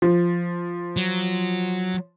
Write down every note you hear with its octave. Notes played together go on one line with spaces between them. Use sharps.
F3
F#3